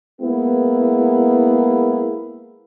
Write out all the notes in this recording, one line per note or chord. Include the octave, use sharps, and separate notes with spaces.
G#3 A#3 B3 E4 G#4